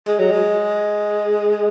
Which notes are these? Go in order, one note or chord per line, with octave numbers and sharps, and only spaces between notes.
G#3
F#3
G#3